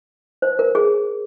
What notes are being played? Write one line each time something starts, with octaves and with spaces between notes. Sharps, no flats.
C5
A#4
G#4